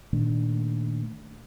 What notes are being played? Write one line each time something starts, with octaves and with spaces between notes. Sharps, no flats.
A#2 D#3 A3 D4